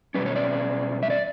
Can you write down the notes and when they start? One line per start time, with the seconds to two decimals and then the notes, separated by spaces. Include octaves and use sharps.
0.14 B2 G3 C#4 B4
0.26 C#5
0.36 D5
1.03 E5
1.10 D5